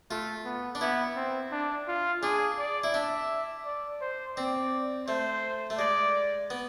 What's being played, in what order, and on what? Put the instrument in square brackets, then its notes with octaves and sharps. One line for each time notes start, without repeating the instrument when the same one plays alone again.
[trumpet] A3 [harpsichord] F4
[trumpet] B3
[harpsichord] D4
[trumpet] B3 [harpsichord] E4
[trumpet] C4
D4
F4
[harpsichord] D4 [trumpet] G#4
[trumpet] D5
[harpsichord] E4
[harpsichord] D4 [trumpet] E5
[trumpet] D5
C5
[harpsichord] C4 [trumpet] D5
[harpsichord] A3 [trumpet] C5
[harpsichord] A3
[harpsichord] G#3 [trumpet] D5
[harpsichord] B3